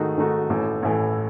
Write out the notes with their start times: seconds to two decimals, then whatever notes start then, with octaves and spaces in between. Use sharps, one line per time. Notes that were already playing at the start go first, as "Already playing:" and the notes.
Already playing: G#2 D#3 A3 D#4 F#4
0.17 G#2 D#3 A3 D#4 F#4
0.50 A1 A2 E3 A3
0.82 A1 A2 E3 A3